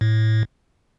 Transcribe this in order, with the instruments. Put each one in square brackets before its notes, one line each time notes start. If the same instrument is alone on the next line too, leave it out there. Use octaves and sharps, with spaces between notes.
[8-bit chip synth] A2